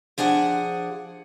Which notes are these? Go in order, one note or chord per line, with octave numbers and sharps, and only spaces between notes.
F3 D4 G#4 F#5